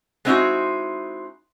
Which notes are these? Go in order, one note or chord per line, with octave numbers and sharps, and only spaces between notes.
G#3 B3 C4 D#4 E4 F#4